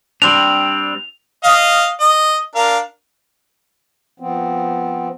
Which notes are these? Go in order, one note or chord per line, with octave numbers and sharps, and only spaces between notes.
G3 C4 D4 F7
D#5 F5
D#5
D4 A#4 F5
F3 B3 C4